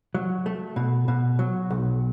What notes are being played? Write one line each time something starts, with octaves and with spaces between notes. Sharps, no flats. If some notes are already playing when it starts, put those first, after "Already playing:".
F#3
A3
B2
B2
F#3
B1